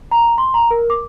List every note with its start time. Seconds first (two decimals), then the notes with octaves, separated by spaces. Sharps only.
0.11 A#5
0.38 C6
0.54 A#5
0.71 A#4
0.90 D6